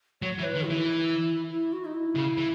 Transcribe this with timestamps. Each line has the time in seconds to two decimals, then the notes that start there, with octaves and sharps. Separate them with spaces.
0.22 F#3 C#5
0.39 E3
0.44 B4
0.55 D#3
0.65 E3 E4
1.51 E4
1.73 F#4
1.85 D#4
1.94 E4
2.16 C#3
2.38 E3